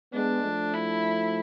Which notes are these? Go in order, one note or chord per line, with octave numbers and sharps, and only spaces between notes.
G#3 B3 D4
F3 A3
E4